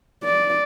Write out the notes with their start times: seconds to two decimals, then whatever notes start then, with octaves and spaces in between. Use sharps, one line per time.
0.24 D5